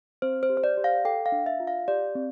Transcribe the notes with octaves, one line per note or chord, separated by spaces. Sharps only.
C4 C5
C5
G4
C5
D5
G4
F5
A4 G5
F5
D4
E5
F4
F5
G4 D5
C4